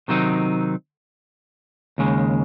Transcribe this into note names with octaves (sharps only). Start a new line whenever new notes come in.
C3 D#3 F#3 C4 D#4
D#2 C#3 G#3